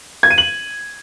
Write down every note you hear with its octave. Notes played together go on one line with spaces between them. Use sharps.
G#6
D#7
F#7